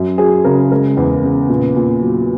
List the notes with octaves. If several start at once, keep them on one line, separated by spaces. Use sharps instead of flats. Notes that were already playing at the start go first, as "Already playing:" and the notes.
Already playing: F#2
F#3 G#4
C#3 A#4
G#3 A#4
E2
C#3
A#2
A#2
F#3